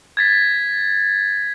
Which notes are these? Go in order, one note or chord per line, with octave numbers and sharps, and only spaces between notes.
G#6 A6 B6